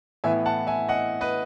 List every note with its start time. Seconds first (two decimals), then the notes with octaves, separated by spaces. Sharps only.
0.24 A2 E3 B3 E4 E5 G#5
0.45 F#5 A5
0.67 E5 G#5
0.89 D#5 F#5
1.21 B4 D#5